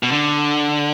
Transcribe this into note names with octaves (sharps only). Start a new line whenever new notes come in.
B2
D3